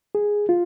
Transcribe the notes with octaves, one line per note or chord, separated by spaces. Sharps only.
G#4
F4